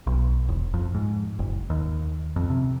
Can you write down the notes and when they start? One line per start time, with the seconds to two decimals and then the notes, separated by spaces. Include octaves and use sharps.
0.07 B1
0.48 E1
0.74 F2
0.95 G#2
1.39 F#1
1.70 D#2
2.36 F2
2.50 C3